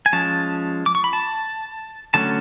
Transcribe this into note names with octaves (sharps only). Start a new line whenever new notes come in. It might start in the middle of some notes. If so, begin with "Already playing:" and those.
G#5
F3 G#3 C#4 A5
D6
C#6
B5
A5
D3 F#3 A3 C#4 A5